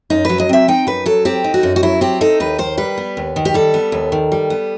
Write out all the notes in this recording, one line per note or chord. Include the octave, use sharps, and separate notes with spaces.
F#2 D#4
F#3 B4
D#5
C4 E5
D#4 G5
F#2 B4
F#3 A4
C4 G4
D#4
F#4
F#2
F#4
F#3 E4
C4 G4
D#4 A4
D#2 B4
D#3 C5
G3 B4
B3
D#2
D#3
G4
G3 A4
B3
D#2
D#3
G3
B3